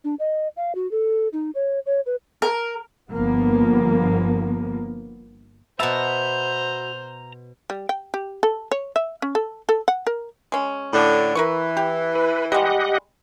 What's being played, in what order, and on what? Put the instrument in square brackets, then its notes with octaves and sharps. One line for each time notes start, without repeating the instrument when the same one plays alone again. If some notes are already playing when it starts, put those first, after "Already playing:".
[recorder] D4
D#5
F5
F#4
A4
D#4
C#5
C#5
B4
[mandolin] A#4
[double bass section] G1 F3 A#3 B3
[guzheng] B2 A5 [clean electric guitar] F#4 B4 E5 [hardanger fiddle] C5 [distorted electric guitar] A#5
[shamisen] G3
G5
G4
A4
C#5
E5
C#4
A4
A4
F#5
A#4
[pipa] G#3 C#4
[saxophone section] A2 D3 D4
[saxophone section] E3 [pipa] A#4 B4 C#6
[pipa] G4
[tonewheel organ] B4
[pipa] G3 G#3 [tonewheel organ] G4 D#5 F#5